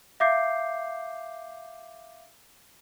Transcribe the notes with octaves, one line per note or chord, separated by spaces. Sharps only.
E5 F5 D6 G6 C7